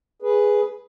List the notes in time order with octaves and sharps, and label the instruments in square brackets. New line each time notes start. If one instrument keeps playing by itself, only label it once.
[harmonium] G#4 B4